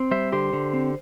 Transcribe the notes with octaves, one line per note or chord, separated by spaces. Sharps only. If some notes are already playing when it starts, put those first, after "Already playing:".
Already playing: C4
G3 C5 E5
D3 G4 C5
D3
C4